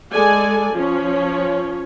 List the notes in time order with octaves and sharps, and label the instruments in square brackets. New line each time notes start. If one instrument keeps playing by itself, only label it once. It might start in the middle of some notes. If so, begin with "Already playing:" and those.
[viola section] G#3 A4 D5 G#5
F3 C#4 C#5